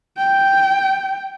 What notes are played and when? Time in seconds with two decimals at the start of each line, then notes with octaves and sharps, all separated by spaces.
0.17 G5